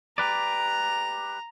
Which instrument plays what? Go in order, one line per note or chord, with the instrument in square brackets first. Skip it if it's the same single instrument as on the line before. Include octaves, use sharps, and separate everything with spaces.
[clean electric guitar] G4 B4 D5 [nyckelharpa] A#5